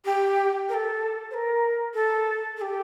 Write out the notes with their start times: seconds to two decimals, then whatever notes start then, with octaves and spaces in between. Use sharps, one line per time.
0.05 G4
0.69 A#4
0.74 A4
1.31 C5
1.34 A#4
1.94 A4
2.57 A4
2.61 G4